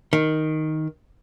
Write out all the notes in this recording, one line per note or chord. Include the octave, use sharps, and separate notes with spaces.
D#3